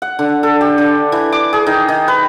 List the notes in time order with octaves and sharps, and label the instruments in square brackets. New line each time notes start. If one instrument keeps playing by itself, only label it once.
[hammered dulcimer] F#5
D3
A4
G4
D3
E3
D6
G#4
D#3
D#3
B4